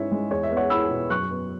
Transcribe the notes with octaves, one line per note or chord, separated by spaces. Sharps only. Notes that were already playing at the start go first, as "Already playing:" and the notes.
Already playing: G#2 C#4 E4 C#5 E5
G#3
E2 C#5
E5
B3
C#5 F#5
E4 B5 E6
B2
F#2 C#6 F#6
B3